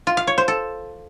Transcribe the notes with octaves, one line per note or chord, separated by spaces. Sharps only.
F4
F5
C#5
C5
A4